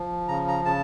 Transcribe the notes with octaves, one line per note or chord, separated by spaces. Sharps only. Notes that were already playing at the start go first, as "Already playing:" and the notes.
Already playing: F3
C#3 A#5
A#5
C#3 A5